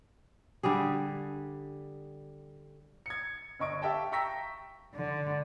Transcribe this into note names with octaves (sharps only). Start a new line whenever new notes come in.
D3 G3 G4 G#4
G#6 C#7
G1 D#5 C#6 D7
G4 E5 F5 G5 A5
G5 A#5 C#6 E6 A#6 B6
D3